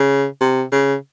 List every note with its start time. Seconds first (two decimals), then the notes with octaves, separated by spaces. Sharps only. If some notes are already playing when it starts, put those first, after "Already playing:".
Already playing: C#3
0.41 C3
0.72 C#3